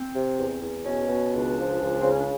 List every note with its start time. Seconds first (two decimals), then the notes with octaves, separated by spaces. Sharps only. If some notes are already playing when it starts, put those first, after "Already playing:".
Already playing: C4
0.15 C3
0.38 E2
0.62 E2
0.85 B2 C#4
1.09 B2
1.32 C#2 D4
1.57 F3
1.80 C#2
2.01 C#3 C4
2.10 C#4
2.19 D4